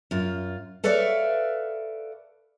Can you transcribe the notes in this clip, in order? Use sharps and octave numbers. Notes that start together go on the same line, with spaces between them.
F#2 F4
A4 B4 C#5 D5 E5 F5